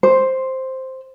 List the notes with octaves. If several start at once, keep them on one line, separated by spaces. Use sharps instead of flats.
C5